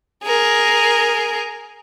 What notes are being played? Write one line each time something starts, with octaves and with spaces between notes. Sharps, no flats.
G#4 A#4